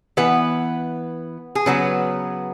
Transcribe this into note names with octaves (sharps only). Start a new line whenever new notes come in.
E3 B3 B4
G#4
C#3 F#3 B3 B4